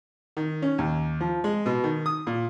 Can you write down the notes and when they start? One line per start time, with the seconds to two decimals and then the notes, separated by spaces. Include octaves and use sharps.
0.37 D#3
0.62 C#4
0.78 D#2
1.20 F3
1.44 G#3
1.66 B2
1.84 D#3
2.06 D#6
2.27 A#2